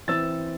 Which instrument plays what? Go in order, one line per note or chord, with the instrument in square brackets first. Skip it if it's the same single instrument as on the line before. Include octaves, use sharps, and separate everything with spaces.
[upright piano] E3 C4 E6 A6